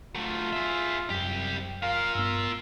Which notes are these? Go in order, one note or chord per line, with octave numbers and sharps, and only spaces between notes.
F#3 A3 F4
G#4 E5
C2 F#2 G4
F4 A#4 F5
G2 B3 E6